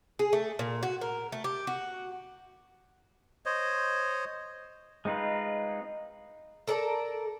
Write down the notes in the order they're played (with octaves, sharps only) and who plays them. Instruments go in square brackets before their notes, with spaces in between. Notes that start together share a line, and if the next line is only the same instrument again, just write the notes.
[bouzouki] G#4
A3
A#2
F#4
A#4
A3
G4
F#4
[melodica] C5 C#5 D#5
[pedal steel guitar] G#3 C4 D#4 F4 B4
[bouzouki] A4 A#4 D5 A5